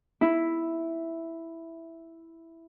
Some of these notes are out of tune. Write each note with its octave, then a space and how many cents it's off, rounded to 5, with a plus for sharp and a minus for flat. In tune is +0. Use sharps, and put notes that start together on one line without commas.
E4 +0